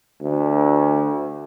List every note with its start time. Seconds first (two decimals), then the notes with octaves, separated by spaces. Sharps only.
0.21 D2